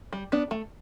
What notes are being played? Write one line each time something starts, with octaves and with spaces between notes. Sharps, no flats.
G3
B3 D4
A3